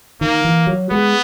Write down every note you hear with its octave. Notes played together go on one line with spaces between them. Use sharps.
D#3 A#3
E3
F#3
G#3 B3